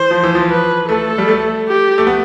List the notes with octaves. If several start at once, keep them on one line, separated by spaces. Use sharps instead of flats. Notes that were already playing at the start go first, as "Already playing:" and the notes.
Already playing: E3 C5
F3
E3
F3
B4
A3 A4
G3
A3
G4
A3
B3